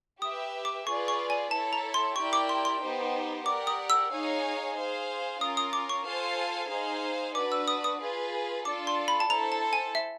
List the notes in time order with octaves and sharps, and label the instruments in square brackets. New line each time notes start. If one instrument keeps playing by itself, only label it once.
[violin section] G4 B4 E5 [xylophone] D#6
[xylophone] D6
[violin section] F4 G#4 B4 D5 [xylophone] C#6
[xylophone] C#6
G#5
[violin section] E4 A4 C#5 [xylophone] A5
[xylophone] A#5
C6
[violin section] E4 G4 A#4 D5 G5 [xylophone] C#6
[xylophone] D6
C6
C6
[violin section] B3 D#4 G4 C5
[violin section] G4 A#4 D5 F#5 [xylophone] D6
[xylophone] D#6
E6
[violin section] D#4 G#4 C#5 F5 G#5
G#4 C5 F5
[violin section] C#4 F4 A#4 [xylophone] D#6
[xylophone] D#6
D6
C#6
[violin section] F4 A4 C5 F5 G#5
D#4 G#4 C5 F5 G#5
[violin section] D4 F#4 B4 D5 [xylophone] D6
[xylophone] E6
D#6
D#6
[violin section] F4 G#4 B4
[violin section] D4 F4 A4 D5 [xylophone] D6
[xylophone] C6
B5
A5
[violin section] E4 A4 C5 [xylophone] A#5
[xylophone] A5
G#5
E5